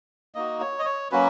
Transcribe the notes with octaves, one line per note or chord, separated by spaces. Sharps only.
A#3 D#4 F#4 D#5
C#5
D#5
C#5
F#3 A#3 C#4 F#4 B4